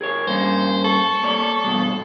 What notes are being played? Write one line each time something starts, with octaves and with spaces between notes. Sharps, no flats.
G#4 A#4 C#5
G2 A#3 C#4 C5
A4 C#6
A#3 C#5 D5
G2 B2 G#3